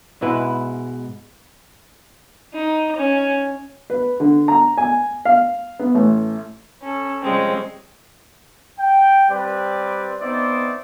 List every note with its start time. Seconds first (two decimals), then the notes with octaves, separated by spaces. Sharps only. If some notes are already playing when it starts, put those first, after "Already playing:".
0.21 G#2 B2 G#3 E4 B4 B5
2.54 D#4
2.97 C#4
3.90 B4
4.20 D3
4.48 A#5
4.78 G#5
5.25 F5
5.79 B3
5.95 A1
6.83 C#4 A4
7.21 C3 F3 G3 G#3 C4 C#4
8.78 G5
9.30 G3 C4 B4 D5
10.21 B3 C4 D#4 C5 D5 E5